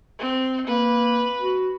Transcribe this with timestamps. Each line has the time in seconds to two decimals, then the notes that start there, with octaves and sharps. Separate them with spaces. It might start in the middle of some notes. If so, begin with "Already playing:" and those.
0.19 C4
0.67 A#3 B4
1.39 F#4